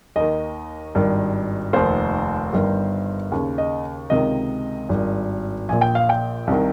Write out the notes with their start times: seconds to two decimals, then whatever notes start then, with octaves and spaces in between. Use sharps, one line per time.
0.16 D#2 D#3 D#5
0.95 G#1 G2 D#3
1.73 F1 D#2 D#3 C5
2.53 G1 G2 D#3
3.32 D#2 C#3
3.58 D#5
4.10 C#2 C3 D#3 D#5
4.89 G#1 G2 D#3
5.69 A#1 A#2 G#5
5.81 G5
5.95 F5
6.09 G5
6.47 C2 C3 D#3